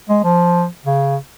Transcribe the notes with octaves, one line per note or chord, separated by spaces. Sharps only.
G#3
F3
C#3